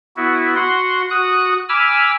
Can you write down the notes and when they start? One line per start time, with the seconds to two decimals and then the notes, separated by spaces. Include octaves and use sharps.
0.17 B3 E4 F#4
0.56 F#4 F#5 C6
1.11 F#4 D#6 F#6
1.69 G#5 B5 D6 E6 F6